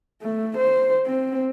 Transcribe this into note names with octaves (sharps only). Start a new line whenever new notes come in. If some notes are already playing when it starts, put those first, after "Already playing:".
A3
C5
C4